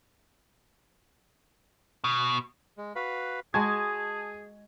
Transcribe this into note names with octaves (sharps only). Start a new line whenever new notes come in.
B2
G#3
F#4 B4 F5 B5
G#3 F#4 G#4 G#5 A5 G#6